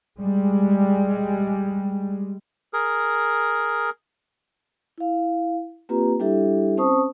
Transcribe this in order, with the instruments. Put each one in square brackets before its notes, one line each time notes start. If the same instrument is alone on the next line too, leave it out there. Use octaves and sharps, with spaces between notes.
[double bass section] G3 G#3
[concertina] G#4 A#4
[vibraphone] E4 F5
A#3 C4 F4 G4 B4 A#5
G3 D4 E4 G4 A4 E5
C4 C#4 C5 A5 C#6 D#6